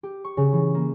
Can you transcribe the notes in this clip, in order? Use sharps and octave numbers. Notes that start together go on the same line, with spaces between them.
G4
C#6
C#3
E3
A#3